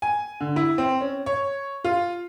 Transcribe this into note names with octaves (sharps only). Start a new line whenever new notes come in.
G#5
D3
E4
C4
C#4
C#5
F4